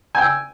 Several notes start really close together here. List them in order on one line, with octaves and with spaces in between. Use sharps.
G#5 G5 E6